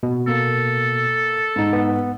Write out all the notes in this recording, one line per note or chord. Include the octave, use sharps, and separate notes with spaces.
B2
A#3 A4
G#2 D#4
B3